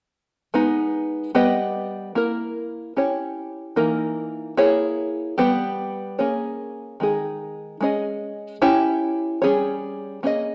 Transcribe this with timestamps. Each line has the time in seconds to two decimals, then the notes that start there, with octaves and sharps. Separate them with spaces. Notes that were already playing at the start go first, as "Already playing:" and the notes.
0.54 G#3 B3 D#4
1.35 G3 B3 G4 B4 D#5
2.15 A#3 E4 A#4
2.97 C#4 E4 G4 C#5
3.76 E3 A#3 D#4 A#4
4.57 A#3 E4 G#4 C#5
5.38 G3 B3 G4
6.19 A#3 C#4 G#4 C#5
7.00 D#3 G#3 D#4 G#4
7.81 G#3 C#4 G#4 D#5
8.62 C#4 E4 G4 C#5
9.42 G3 C#4 G#4 C#5
10.23 A#3 C#4 G#4 B4 D#5